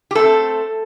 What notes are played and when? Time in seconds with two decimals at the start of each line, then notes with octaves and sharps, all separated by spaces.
0.11 G4
0.15 A3 C4 A4